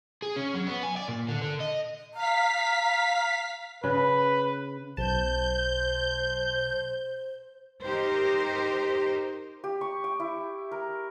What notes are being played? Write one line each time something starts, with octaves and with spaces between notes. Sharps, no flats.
G#4
C#4
F#3
B3
G#5
D5
A#2
D3
D3
D#5
F5 A#5 B6
C#3 B4
B1 C5 A5 G6
D#4 G4 A#4 C5
G4
C#6
G5
E4
A#4